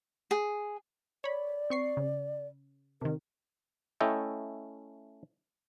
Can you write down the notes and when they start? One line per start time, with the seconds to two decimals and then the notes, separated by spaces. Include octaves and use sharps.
0.31 G#4
1.24 C#5 D5 B5
1.70 C4 C#6 C7
1.97 C#3
3.01 C3 D#3 A#4
4.00 A3 C#4 E4 A4 D#5 G5